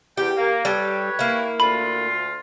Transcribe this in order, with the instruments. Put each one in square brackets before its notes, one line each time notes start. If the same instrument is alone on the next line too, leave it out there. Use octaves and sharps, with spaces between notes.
[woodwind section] E2 G5 [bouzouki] G4
[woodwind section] A#3
[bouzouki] G3 A4 [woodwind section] G4 B4 C#5
[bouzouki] A#3 E4
[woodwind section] D2 F4 [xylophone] B5